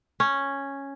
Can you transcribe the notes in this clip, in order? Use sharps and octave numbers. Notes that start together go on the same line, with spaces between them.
C#4